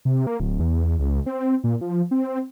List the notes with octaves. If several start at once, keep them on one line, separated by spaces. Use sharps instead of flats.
C3
A#3
D1
E2
C#2
C4
A#2
F3
C4